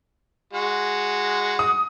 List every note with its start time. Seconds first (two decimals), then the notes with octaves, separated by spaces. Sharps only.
0.53 G#3 F#4
1.59 D#6